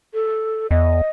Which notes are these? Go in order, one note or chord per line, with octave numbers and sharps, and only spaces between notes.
A4
E2 D#5